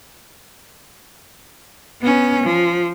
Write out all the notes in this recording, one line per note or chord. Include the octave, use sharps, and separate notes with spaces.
B3 C#4
F3